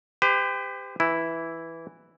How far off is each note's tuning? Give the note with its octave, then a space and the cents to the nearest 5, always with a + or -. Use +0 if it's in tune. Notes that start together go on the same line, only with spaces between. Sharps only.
G4 +25 C5 -45
E3 +0 E4 +0